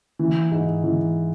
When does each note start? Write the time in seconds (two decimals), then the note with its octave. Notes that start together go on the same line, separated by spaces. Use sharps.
0.19 E3
0.51 G#2
0.84 E3